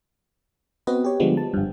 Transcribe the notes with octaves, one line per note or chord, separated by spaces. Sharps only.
B3 C4 F#4 B4 D#5
G4 C#5
D3 F3 G3 G#3 B3
A5
G1 G2